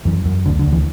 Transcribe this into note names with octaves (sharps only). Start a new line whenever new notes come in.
F#2 E3
F#2
D2 D3
D3
D2
E3